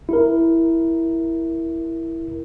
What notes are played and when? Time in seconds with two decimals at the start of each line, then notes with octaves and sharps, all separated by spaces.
0.09 E4 A#4